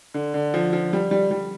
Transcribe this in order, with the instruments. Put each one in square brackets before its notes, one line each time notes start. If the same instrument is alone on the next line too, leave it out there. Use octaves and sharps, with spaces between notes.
[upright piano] D3
D3
F3
F3
G3
G3
G3